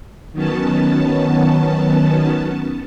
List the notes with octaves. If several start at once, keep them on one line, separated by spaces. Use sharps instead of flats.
D#3 F#3 B3 C#4 A5